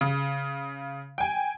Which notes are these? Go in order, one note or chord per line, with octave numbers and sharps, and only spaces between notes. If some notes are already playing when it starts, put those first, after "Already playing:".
C#3
G5 G#5